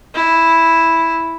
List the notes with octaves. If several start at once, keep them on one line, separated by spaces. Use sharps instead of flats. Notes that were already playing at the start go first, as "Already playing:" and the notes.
E4